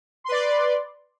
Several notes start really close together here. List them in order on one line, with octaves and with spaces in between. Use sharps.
C6 B4 D5